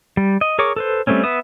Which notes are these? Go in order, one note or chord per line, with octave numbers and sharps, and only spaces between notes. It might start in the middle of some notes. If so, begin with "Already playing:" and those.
G3
D#5
G#4 A#4 C#5 C#6 D6
A4 B4 C5
G3 A3 A#3 C4 C#4
B3 B4 E5 D#6